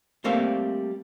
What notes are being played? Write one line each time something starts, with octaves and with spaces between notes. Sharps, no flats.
G3 A3 A#3 C4 F5